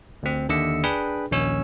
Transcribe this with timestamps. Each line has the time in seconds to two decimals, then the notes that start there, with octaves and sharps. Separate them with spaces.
0.23 D2 C4
0.49 D#2 D3 D#5 E5 E6 C#7
0.84 D4 G#4 B4 G5 B5
1.31 A#1 D#2 C#4 C#5 E6